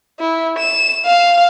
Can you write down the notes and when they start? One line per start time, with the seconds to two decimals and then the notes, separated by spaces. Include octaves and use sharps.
0.19 E4
0.59 E7
1.06 F5